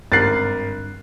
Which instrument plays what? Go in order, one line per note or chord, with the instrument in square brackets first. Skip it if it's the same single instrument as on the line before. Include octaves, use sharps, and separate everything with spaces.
[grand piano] G#1 A#4 F#6 [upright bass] G2 D3 [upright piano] A6 C7